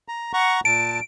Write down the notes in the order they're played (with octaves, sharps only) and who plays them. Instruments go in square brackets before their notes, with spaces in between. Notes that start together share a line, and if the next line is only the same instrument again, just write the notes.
[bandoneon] A#5
F#5 A#5 C#6
[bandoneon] A#2 A5 [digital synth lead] D7